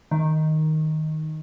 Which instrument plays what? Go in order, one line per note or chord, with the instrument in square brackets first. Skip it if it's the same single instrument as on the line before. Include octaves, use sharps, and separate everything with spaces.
[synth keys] D#3